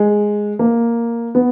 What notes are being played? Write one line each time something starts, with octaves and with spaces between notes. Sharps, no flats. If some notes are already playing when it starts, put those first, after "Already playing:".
Already playing: G#3
A#3
B3